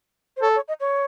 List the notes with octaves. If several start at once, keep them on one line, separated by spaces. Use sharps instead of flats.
C5
A4 C#5
C#5
D#5
C#5